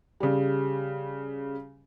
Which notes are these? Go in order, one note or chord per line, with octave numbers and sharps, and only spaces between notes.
C#3 G3